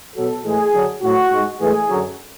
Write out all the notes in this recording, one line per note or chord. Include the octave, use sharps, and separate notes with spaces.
B2 F#3 A4
A2 E3 G#3 G#4
F#2 D3 F#3
A2 F#3 F#4
G#2 G#3
A2 E3 G#3 G#4
F#2 D3 F#3